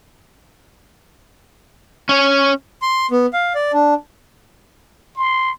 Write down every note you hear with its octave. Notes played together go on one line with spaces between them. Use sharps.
C#4 C#5
C6
B3
F5
D5
D4
C6